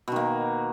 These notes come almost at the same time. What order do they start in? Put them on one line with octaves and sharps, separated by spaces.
B2 D#3 A#3